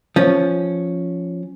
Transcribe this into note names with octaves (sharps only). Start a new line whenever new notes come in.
F3 C#4